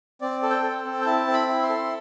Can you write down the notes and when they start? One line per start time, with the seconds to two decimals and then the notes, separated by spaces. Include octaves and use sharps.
0.21 C4 D5
0.43 A4
0.50 G5
0.63 A4
0.85 C4
1.01 G5
1.05 E4 A5
1.27 C4
1.34 B5
1.48 E4
1.63 C6
1.69 A4